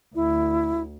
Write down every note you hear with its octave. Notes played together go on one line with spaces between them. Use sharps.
D2 E4